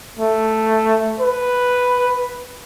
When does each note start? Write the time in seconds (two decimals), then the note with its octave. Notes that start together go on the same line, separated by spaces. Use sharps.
0.19 A3
1.20 B4